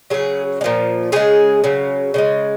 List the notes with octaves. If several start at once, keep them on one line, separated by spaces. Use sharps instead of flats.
C#3 F#3 G#4
G#3
A#2 F3
C#3 F3 G#3 G#4
C#3 F#3
C#3 F3 G#3